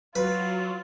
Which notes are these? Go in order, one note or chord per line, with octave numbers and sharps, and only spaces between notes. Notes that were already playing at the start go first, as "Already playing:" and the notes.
F#3 F4 B4